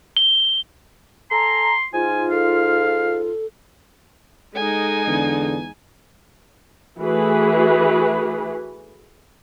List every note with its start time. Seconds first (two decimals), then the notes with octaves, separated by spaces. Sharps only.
0.17 G7
1.31 A4 G#5 A#5 C6
1.93 G#2 D#4 F4 G#5
2.31 A4 F5
4.55 G#3 D#4 A4 G#5
5.07 E2 D3
6.99 E3 A3 F#4 G#4 B4